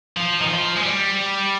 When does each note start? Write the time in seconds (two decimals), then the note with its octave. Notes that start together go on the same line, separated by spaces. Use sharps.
0.17 F3
0.41 D#3
0.49 F3
0.76 G#3
0.83 G3